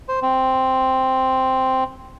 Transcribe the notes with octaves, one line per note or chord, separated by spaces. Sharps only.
C5
C4